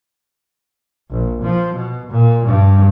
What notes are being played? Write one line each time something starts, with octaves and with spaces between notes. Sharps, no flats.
A#1
F3
B2
A#2
G2